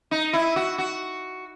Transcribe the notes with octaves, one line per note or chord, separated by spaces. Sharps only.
D#4
E4
F#4
F#4